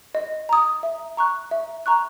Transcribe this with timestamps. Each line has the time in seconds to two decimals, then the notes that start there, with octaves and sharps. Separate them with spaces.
0.15 D#5
0.49 A#5 D#6
0.83 E5
1.17 A#5 C#6 F#6
1.51 E5
1.86 A#5 C#6 F#6